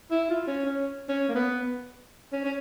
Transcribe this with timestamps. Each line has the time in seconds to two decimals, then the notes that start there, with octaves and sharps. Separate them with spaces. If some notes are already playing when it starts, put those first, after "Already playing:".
0.11 E4
0.30 F4
0.47 C#4
0.66 C#4
1.09 C#4
1.29 A#3
1.35 B3
2.33 C#4
2.45 C#4